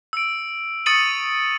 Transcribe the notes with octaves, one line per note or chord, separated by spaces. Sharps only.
E6 D7
C#6 D#6 A6 C#7 D#7 F#7